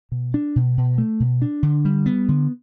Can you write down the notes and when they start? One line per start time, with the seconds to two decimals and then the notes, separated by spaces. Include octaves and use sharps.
0.12 B2
0.34 D4
0.56 B2
0.77 B2
0.98 A3
1.20 B2
1.42 D4
1.63 D3
1.85 G3
2.06 B3
2.28 D3